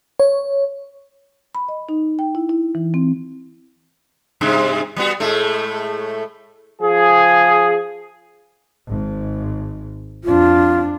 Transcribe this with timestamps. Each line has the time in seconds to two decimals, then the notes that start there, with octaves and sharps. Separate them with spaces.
0.20 C#5
1.55 B5
1.68 D#5
1.89 D#4
2.19 G5
2.35 E4
2.49 E4
2.75 E3
2.94 C4
4.41 G2 C3 G#3
4.96 G3 B3 F#4
5.20 A2 G#3 A3
6.82 F3 G#4
8.88 G#1 G#2
10.24 F2 D4 F4